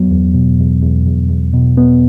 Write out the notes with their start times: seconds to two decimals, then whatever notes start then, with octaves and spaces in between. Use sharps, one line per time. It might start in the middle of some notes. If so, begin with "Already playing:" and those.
Already playing: E2 F#3 B3
0.11 E2
0.34 B2
0.59 E2
0.83 E2
1.06 E2
1.29 E2
1.53 B2
1.77 B3